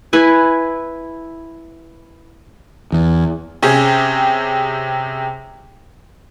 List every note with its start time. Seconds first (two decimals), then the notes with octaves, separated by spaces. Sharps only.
0.13 E4 B4 G#5
2.92 E2
3.63 C3 C#4 G4 G#4